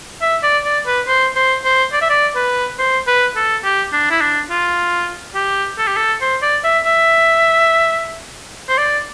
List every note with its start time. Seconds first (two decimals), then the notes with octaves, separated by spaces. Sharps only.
0.21 E5
0.43 D5
0.64 D5
0.86 B4
1.07 C5
1.36 C5
1.64 C5
1.92 D5
2.01 E5
2.10 D5
2.35 B4
2.79 C5
3.07 B4
3.36 A4
3.64 G4
3.93 D4
4.10 E4
4.21 D4
4.50 F4
5.35 G4
5.78 A4
5.87 G4
5.96 A4
6.21 C5
6.42 D5
6.64 E5
6.85 E5
8.68 C5
8.78 D5